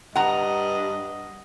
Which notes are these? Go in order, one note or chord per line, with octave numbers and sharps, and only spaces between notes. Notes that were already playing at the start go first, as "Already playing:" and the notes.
G2 D#5 F#5 A#5